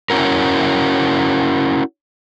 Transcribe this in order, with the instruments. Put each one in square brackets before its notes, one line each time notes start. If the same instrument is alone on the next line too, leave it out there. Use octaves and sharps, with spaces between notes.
[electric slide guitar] C#4 E4 F#4 A#4